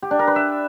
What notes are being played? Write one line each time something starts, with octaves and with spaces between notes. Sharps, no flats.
G4
D4
A#4
B4
E5